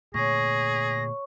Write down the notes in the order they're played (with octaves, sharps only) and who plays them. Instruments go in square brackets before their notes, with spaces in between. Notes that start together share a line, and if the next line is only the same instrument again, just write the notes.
[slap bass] A#2 D3 A3 [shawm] G#4 [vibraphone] C#5 C#6 [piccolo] A#6